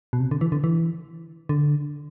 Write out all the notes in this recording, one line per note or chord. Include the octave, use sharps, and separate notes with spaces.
B2
C3
D3
E3
D3
E3
D3